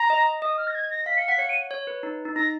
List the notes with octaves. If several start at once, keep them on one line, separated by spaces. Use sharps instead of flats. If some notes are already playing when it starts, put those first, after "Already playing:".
Already playing: A#5
D#5
D#5 D#6
F6
A#6
G#6
A#6
F5 B6
F5 C#7
F#5 B6
C#5 C#7
D#7
C#5
B4
D#4
D#4
D#4 A#6